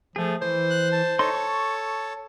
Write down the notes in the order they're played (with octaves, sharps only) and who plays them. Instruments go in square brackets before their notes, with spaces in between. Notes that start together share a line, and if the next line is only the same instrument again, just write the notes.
[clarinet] F3 [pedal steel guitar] A3 G#4
[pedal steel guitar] E3 [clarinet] C5
[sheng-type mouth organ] F#6
A5
[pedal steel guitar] D#4 C6 [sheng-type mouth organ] A4 C#5 A5
[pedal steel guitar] C#6